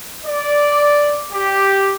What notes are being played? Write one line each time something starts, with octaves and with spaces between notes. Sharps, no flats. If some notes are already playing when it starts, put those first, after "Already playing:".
D5
G4